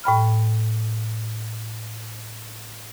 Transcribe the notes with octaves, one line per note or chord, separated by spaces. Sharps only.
A2 G5 B5 F6